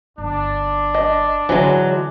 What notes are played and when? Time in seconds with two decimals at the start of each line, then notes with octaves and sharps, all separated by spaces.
0.18 G1 D4
0.95 D#5
1.49 D3 E3 F#3 G#3